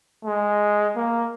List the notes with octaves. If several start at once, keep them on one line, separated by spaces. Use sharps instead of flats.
G#3
A#3